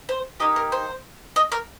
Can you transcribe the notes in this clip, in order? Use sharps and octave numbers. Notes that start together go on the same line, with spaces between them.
C5
A#3 D#4 G4 D#5
A#4
C5
D#5
A#4